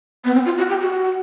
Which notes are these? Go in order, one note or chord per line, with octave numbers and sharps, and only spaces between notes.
B3
C4
F4
F#4
G4
F#4